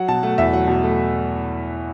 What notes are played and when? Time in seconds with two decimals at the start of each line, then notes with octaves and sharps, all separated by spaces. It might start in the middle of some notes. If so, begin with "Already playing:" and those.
Already playing: F#3 F#5
0.08 B2 A5
0.23 A3 F#5
0.38 E2 E5
0.53 F#3 F#5
0.67 B2
0.83 A3